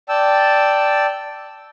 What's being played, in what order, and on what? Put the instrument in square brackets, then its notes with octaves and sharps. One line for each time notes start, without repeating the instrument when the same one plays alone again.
[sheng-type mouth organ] D5 G5 A5 E6